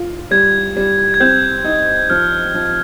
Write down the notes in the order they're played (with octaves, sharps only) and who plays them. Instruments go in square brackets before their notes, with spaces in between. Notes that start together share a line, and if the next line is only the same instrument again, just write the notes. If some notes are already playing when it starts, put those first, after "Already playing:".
Already playing: [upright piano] F4
[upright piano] G3 [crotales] G#6
[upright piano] G3
[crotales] G#6
[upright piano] C4 [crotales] G6
[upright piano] D#4
[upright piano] F3 [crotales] F6
[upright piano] F3